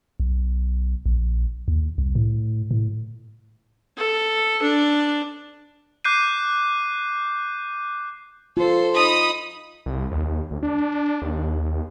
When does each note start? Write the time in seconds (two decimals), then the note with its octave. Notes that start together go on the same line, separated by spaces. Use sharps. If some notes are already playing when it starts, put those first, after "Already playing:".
0.20 B1
1.06 A#1
1.68 D#2
1.98 C2
2.15 A2
2.71 A2
3.98 A4
4.62 D4
6.05 D6 F#6 G6 C7 D#7
8.57 F4 A4 C5
8.95 D#4 B5 D#6
9.86 C2
10.12 D#2
10.51 D2
10.63 D4
11.22 D#2